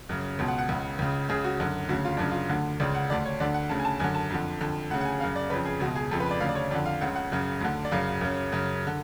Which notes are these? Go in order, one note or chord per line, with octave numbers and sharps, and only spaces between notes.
F#2 C#3
C#2 B2
F#5
F#5
C#2 C#3
C#2 C#3
C#2 C#3 G#4
F#4
F#2 D3
D2 C#3 F#4
F4
F#2 C#3 D4
F4
D2 D3
C#2 C#3 D5
F#5
D2 D3 D5
C#5
D2 D3 D5
F#5
D2 C#3 A5
G#5
A5
F#2 D3 G#5
A5
F2 D3
F2 D3
D2 C#3 F#5
F#5
G#5
F#2 C#3 F5
D5
F2 C#3 B4
G#4
C#2 B2 F#4
G#4
F2 C#3 A4
B4
D5
D2 C#3 F5
D5
C#5
F2 D3 D5
F5
C#2 C#3 F#5
F#5
F#2 C#3
D2 D3
D5
F#2 C#3 F5
F#2 C#3
F#2 C#3
D3